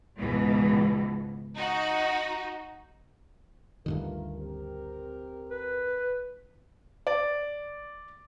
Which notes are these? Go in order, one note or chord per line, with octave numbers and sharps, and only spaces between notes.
C#2 G#2 B2 E3
D#4 F#4
D2 G2 D#3 A3 F4 A#4
C4 G4 A#4
B4
D5